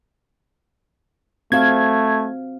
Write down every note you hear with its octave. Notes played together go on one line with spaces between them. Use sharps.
A3 C4 F#4 F5 G#6